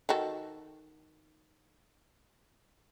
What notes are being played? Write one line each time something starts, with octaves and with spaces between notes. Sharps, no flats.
D#3 F#4 A4